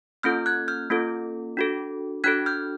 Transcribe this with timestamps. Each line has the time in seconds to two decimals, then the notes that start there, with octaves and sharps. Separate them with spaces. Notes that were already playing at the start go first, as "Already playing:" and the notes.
0.23 A#3 C#4 F4 A4 F6 G6
0.46 F#6 G#6
0.68 F6 G6
0.90 A#3 C#4 F4 A4
1.57 D4 F#4 A4
2.24 D4 F#4 A4 F#6 G#6
2.46 F6 G6